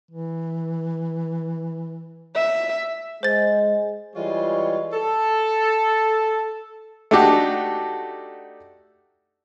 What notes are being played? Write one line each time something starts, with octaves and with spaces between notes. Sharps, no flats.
E3
E5
G#3 C5 A6
E3 G3 G#3 F4 C#5
A4
A3 D4 D#4 F#4 G4